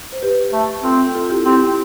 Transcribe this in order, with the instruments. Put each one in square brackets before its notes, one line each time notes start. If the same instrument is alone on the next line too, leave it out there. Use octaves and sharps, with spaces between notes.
[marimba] C5
G4 B4
[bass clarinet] A3
[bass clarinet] C4 [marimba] F4 A4
[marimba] F4 A4
F4
E4 G4
[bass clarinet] C4 [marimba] E4 G4